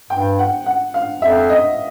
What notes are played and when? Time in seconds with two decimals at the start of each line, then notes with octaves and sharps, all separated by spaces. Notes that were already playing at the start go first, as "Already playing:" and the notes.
0.10 G2 G5
0.39 F#5
0.66 F#5
0.94 F5
1.21 F2 E5
1.50 D#5